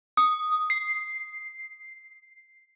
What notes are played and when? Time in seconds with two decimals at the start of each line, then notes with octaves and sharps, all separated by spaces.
0.17 D#6
0.70 C7